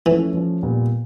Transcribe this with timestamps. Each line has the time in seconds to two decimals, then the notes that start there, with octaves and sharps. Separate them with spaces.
0.06 E3 F3 A3 C#4
0.34 F3 A3 C#4
0.63 A#2 G3 B3